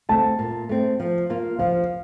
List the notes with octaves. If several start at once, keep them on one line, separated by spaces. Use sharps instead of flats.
A3 C4 A5
A#2
A3 C4
F3
A#3 F4
F3 F5